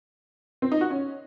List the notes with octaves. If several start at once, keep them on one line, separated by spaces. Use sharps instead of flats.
C4
D#4
F#4
C#4